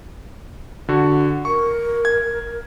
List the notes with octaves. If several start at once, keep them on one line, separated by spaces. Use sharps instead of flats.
D3 F#4
A#4 C#6
G#6